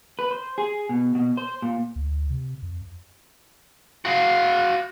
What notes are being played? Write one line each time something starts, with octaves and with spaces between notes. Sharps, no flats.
B4
C5
G#4
B2
B2
C5
A#2
D2
C3
F2
F#4 F5